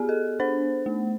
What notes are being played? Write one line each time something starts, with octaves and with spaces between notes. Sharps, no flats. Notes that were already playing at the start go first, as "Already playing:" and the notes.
Already playing: B3 G4 G#4
A4
D4 C5
A3